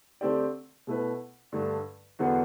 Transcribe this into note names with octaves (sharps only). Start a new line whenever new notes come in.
D3 A3 C4 G4 D5
B2 A3 E4 B4
G2 D3 A3
E2 D3 F#3 B3 F#4